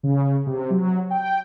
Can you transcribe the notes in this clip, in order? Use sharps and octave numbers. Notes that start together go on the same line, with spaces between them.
C#3
C3
F#3
G5